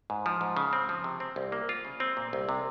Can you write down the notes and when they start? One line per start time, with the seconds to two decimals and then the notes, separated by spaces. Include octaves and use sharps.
0.10 G#2
0.26 F3
0.41 G#2
0.57 C#3
0.73 C4
0.89 F3
1.04 C3
1.20 C4
1.36 C2
1.52 A#3
1.69 F4
1.85 C#3
2.00 C4
2.17 A#2
2.33 C2
2.49 C3